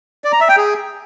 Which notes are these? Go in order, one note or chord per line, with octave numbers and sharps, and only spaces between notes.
D5
A#5
E5
G5
G#4